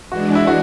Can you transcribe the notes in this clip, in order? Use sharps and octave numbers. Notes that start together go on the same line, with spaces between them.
E3 G#3 D4 F#4
E4
F#4